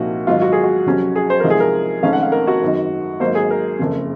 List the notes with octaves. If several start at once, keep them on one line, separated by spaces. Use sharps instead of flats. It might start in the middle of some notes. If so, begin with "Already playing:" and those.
Already playing: C2 A#2 F3 A#3 D#4 F#4
G#1 G#2 D#3 F#3 F4
F#4
G#4
F#4
F2 C3 F#3 C#4
G#4
C5
C2 C3 F3 G#3 D#4 A#4
G#4
A#4
F1 F2 D#3 G#3 C#4 F5
F#5
F5
A#4
F#4
G#1 F#2 D#3
G#1 G#2 F#3 A#3 C5
G#4
A#4
F#1 F2 C#3